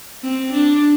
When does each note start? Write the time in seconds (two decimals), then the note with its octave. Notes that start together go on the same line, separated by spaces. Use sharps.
0.23 C4
0.53 D4